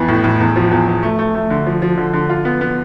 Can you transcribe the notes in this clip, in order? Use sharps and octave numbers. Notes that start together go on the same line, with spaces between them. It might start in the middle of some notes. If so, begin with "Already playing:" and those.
Already playing: F2 E3 B3
A2
A2
E2
F3
E2
E2
A3
A3
A3
D3
F3
F3
D3
D3
F4
B3
B3